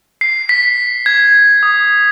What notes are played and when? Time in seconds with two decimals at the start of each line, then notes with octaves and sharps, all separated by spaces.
0.21 C7
0.49 B6
1.06 G#6
1.63 D#6